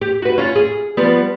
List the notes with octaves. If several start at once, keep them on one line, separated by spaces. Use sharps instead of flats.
G4
F#4 B4
C#4 F4
G#4
F3 G3 B3